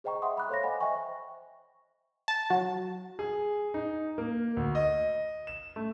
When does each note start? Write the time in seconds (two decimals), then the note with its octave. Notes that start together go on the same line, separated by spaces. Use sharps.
0.04 G#4 C5 D#5 G5 A#5 C#6
0.22 D#5 E5 F#5 G5 C6 D#6
0.36 E5 B5 D6 F#6
0.49 A4 C5 C#5 F5 B5 A#6
0.63 C5 D#5 F#5 G#5 B5
0.80 C5 D#5 E5 G5 G#5 C#6
2.28 A5
2.50 F#3
3.19 G#4
3.74 D#4
4.18 A#3
4.57 D2
4.75 D#5
5.47 E7
5.76 A3